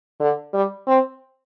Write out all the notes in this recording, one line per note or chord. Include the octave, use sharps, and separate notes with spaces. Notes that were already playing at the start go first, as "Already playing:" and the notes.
D3
G3
C4